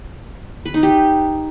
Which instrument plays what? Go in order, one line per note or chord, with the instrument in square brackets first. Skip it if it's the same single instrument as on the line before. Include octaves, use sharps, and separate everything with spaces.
[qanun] B4
D#4
G4